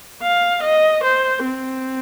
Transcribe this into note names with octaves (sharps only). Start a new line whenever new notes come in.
F5
D#5
C5
C4